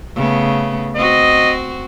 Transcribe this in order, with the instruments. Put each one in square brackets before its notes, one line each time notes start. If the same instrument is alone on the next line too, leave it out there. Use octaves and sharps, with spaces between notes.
[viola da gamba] C#3 A3 B3
[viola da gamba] C4 F#4 [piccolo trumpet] D#5